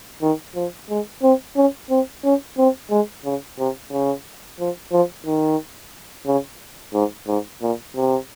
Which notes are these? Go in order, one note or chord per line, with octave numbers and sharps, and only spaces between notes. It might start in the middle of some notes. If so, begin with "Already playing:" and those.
D#3
F3
G#3
C4
C#4
C4
C#4
C4
G#3
C#3
C3
C#3
F3
F3
D#3
C#3
G#2
G#2
A#2
C3